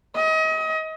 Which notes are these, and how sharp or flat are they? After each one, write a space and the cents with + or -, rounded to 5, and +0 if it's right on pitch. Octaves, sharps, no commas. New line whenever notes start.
D#5 +35